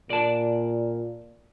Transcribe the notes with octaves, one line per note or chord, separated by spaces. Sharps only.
A#2 D5 A5